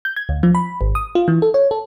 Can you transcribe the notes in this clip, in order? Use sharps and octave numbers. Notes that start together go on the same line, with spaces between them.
G6
G#6
D2
F3
B5
G#1
D#6
F4
E3
A4
C#5
A4